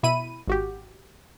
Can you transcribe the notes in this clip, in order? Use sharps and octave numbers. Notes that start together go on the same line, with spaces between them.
B2 E4 B5 D#7
G#1 F#4 G4